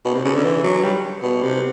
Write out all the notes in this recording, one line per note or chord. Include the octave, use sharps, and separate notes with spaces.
B2
C3
C#3
D3
E3
F#3
G3
B2
C3